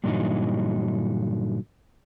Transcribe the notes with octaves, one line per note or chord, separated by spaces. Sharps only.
G2 A#2 D3 E3 F#3 D#4